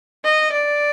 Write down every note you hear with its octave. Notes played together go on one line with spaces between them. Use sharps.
D#5
D5